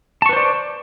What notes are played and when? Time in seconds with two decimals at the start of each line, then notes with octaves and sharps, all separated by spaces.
0.22 A5
0.26 C#6
0.29 B4
0.33 C5
0.36 D5